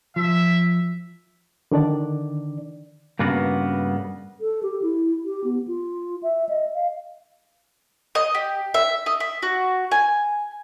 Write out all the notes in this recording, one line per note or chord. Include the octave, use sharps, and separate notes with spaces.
F3 E5
D3 D#3 D4 D5
G2 C#3 A#3 B3 F#4
A4
G4
E4
G4
B3
F4
E5
D#5
F5
D#5
G4
E5
D#5
E5
F#4
G#5